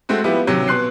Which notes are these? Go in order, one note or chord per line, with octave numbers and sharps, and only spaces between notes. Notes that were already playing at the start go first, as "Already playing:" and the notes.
G#3 A3 C4 F#4
F3 G3 B3 E4 G4
D#2 C3 F#3 C#4
B2 C6 F#6 C7